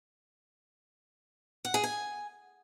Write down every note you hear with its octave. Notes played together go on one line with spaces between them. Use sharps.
F#5
G#4
G#5